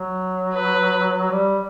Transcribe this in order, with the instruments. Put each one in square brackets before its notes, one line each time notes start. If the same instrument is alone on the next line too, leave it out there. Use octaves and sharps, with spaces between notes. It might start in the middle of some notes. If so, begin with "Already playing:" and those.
Already playing: [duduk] F#3
[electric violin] B4
[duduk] G3